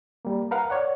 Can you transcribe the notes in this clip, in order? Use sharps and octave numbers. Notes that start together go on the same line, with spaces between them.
G3 A#3
A#4 B4 F5 F#5
C#5 D5 F#5